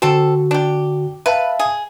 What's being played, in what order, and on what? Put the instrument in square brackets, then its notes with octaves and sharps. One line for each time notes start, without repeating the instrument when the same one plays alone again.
[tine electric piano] D3 F#4 [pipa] C4 A4
[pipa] D4 G4
[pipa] B4 [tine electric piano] E5 F5 A5
[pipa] G#4